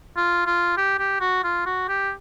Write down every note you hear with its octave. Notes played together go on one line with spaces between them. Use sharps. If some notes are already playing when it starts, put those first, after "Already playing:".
F4
F4
G4
G4
F#4
F4
F#4
G4